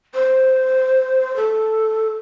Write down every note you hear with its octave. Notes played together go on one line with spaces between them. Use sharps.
C5
A4